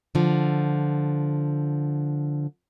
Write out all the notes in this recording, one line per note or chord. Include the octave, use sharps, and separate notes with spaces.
D3 F3